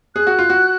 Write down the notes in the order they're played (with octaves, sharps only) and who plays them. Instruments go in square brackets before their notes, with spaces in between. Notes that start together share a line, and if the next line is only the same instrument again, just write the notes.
[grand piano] G#4 [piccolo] F#6
[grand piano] F#4
F4
F#4